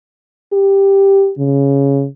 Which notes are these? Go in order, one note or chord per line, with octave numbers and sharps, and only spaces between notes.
G4
C#3